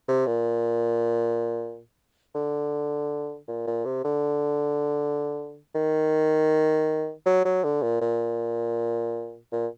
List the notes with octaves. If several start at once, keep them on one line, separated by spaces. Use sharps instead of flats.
C3
A#2
D3
A#2
A#2
C3
D3
D#3
F#3
F#3
D3
A#2
A#2
A#2